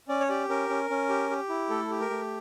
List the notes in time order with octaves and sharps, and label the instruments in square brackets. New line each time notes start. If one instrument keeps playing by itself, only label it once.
[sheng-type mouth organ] C#4 D5
C#5
G4 D5
C#4 A#4
C#4
C#4
G4
G4
E4
A3 A4
G4
A#4
A3